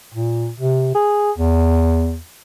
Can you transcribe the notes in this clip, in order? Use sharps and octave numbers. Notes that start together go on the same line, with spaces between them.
A#2
C3
G#4
E2